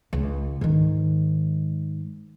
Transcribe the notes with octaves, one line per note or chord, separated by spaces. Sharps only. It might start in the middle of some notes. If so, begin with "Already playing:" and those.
C#2
G#2 D#3